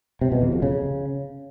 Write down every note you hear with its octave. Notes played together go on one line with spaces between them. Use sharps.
C3
B2
E2
F2
C#3